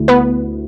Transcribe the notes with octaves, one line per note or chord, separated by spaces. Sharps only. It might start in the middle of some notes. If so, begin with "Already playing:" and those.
Already playing: D2 D3 A3 E4
B3 B4